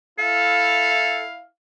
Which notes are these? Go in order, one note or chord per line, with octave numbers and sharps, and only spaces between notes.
E4 A4 F5